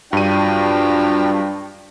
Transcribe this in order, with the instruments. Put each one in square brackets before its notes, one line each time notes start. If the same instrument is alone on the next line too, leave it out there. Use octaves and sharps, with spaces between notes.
[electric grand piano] G2 D#7 [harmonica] F3 F#3 G5 [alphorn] D4